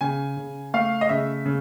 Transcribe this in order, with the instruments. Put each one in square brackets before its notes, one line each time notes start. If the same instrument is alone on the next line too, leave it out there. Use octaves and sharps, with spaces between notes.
[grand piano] C#3 G#5
C#3
A3 F5
D#5
C#3 E5
C#3